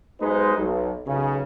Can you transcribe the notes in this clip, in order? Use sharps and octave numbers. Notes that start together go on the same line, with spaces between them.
B1 G#3 D#4 B4 C5
B1
B1 C#3